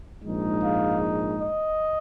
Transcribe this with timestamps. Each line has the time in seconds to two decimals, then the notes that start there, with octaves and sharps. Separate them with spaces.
0.23 A#1 G#2 G#3 D#4
0.63 F5
1.43 D#5